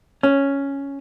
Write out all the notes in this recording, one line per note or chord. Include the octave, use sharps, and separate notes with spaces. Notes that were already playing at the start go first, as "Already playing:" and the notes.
C#4